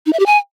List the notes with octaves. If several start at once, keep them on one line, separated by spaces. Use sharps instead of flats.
D#4
E5
G4
G#5